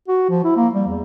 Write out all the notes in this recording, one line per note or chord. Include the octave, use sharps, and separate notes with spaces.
F#4
F3
E4
A#3
G3
E2